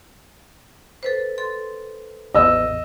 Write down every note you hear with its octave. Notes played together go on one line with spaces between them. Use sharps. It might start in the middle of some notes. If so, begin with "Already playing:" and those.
A4 B4 C5
A4 C6
A1 E2 D#5 E6